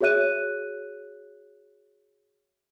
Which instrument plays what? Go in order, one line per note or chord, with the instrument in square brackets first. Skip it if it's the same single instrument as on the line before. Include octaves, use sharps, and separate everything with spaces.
[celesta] F#4 G#4 C#5 E5 F#6 D#7